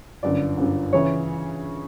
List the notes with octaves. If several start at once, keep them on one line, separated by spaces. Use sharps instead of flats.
G1 F#2 D3 D5
G1 F#2 D3
C#3 E3 C#5